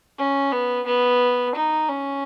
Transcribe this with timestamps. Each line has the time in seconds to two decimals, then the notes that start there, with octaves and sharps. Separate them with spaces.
0.18 C#4
0.52 B3
0.86 B3
1.55 D#4
1.88 C#4